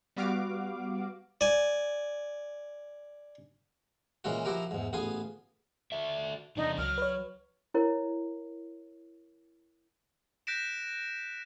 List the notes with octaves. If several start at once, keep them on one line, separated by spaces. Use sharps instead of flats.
G3 B3 F#4 F5 D6
D5 G#5
A#2 E3 G#3 C#4 F#4
F3 E4 F#4 G4 A#4
E2 G#2
A1 B3 F4 G#4 G#5
F#4 A4 E5
E2 C3 D4 D#4
C#2 F#3 F6
B4 C#5
E4 A#4 C#5
F#6 G6 A#6 B6 D7 E7